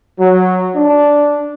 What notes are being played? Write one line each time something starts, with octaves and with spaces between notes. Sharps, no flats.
F#3
D4